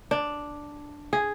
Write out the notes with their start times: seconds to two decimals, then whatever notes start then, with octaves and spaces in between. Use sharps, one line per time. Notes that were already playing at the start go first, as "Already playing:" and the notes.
0.11 D4
1.13 G#4